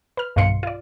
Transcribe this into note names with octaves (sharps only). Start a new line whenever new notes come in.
B4 F6
B1 G2 D#3 F5 C6 C#7
F4 D5